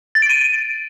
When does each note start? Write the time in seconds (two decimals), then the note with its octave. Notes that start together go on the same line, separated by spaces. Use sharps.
0.15 A6
0.22 D7
0.29 D#7